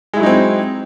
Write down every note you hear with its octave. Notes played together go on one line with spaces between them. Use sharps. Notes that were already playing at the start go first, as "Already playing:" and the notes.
F#3 G#3 C4 D#4 E4